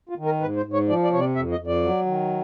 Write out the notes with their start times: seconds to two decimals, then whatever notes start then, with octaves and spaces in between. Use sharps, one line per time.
0.09 F4
0.18 D#3
0.25 A#4
0.41 G#2 B4
0.57 C5
0.65 G#2
0.73 C#5
0.89 F3 D5
1.04 D5
1.13 C3 C#5
1.20 D5
1.36 F2 E5
1.52 D#5
1.59 F2
1.67 D5
1.83 F#3
2.06 D#3